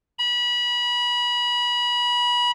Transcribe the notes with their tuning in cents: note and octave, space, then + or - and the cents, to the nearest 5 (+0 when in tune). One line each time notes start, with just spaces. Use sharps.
B5 -30